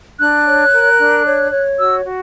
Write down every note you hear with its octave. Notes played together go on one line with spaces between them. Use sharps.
D4 F#6
C#5
A#4
D4
C#5
C#5
F#4 E6
F#4